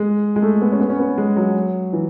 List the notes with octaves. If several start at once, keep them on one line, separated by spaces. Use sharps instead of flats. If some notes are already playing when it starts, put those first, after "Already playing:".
Already playing: G#3
G#3
A3
B3
C#4
B3
C#4
B3
G#3
F#3
E3